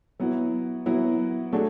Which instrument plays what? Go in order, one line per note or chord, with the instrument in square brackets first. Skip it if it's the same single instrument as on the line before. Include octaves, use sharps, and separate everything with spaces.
[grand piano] F#3 B3 E4
F#3 B3 E4
F#3 A3 D4 G#4